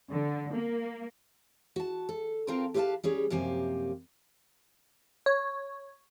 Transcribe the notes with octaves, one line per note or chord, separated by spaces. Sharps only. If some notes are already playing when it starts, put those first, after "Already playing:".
D3
A#3
F#4 A5
A4
C4 F4 A#4 F5 G5 A5
G4 B4 C5 E5 F5 A5
G3 C#4 G#4 C#5
F#2 C3 F3 A#3 G4 G#5
C#5